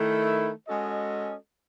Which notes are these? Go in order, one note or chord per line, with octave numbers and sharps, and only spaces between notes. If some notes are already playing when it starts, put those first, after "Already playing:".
Already playing: D#3 A3 E4
G#3 C#4 F#4 A4 D#5